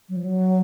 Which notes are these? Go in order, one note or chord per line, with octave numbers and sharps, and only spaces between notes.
F#3
F3
F#3